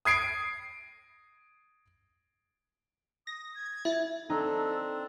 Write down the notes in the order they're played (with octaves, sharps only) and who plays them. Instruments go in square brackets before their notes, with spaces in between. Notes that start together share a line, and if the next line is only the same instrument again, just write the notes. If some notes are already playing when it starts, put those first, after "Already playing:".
[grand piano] D#6 G#6 C7 D7
[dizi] D#6 [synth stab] A#6
[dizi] G#6
[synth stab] E4 A6 [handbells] E5
[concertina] C4 D4 [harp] D#4 [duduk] A4